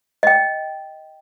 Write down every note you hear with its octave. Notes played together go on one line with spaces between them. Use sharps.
D#5 G5